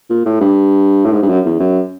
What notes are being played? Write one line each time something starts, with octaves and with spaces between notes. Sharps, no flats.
A#2
A2
G2
A2
G#2
G2
F#2
E2
F#2